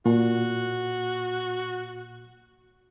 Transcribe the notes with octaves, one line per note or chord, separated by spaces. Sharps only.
A#2 F#4